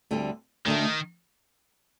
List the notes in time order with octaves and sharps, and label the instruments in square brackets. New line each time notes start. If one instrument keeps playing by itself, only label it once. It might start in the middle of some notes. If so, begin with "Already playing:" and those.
[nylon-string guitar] D2 D3 G3 C4
[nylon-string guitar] D2 D3 A3 [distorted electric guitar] D#3